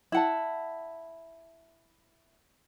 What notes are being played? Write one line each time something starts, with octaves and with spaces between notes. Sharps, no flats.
E4 F#5 A5